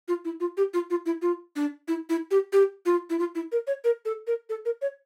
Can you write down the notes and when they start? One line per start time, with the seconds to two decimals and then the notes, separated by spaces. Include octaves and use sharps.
0.08 F4
0.25 E4
0.40 F4
0.57 G4
0.74 F4
0.90 F4
1.06 E4
1.22 F4
1.56 D4
1.88 E4
2.09 E4
2.31 G4
2.53 G4
2.86 F4
3.10 E4
3.19 F4
3.35 E4
3.52 A#4
3.67 C#5
3.84 A#4
4.05 A4
4.27 A#4
4.49 A4
4.65 A#4
4.82 C#5